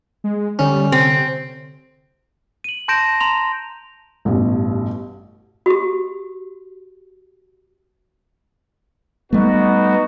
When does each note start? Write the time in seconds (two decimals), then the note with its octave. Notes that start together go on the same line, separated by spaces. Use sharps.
0.24 G#3
0.59 D3 G3 C#4
0.92 C3 C4
2.64 D#7 F#7
2.88 A5 C6 G6 A#6 D7 E7
3.20 A#5 C6 F7
4.25 A1 G2 B2
5.66 F#4 G4
9.33 G3 A3 B3 D#4 F#4